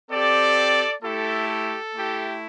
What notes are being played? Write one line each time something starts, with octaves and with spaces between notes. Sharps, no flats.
C4 G4 A4 D5
A3 E4 G4 A4
A4
A3 E4 G4